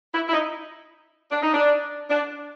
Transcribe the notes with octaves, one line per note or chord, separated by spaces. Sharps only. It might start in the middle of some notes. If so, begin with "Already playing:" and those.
E4
E4
D#4
D4
D#4
D4
D4